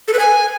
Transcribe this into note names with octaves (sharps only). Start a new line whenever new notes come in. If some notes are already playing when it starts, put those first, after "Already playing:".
A4
B4
G#5